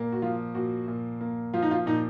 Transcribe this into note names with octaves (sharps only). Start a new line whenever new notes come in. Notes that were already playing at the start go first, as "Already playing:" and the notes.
Already playing: A#2 A#3
F#4
F3 F4
A#2 F#4
A#2
A#3
F3 F4
D#4
F4
A#2 D#4